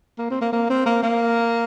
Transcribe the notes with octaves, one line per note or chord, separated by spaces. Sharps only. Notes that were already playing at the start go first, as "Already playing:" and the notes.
A#3
C4
A#3
A#3
C4
A#3
A#3